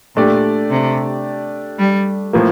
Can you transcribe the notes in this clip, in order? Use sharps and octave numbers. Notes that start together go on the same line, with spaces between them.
A#2 A3 D4 G4 D5
C3
G3
A2 F3 A#3